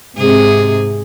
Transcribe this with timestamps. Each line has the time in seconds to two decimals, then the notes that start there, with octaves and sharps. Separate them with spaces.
0.18 G#2 C3 G#4